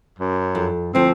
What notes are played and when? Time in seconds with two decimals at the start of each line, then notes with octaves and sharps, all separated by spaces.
0.19 F#2
0.55 F2
0.95 D2 F3 C4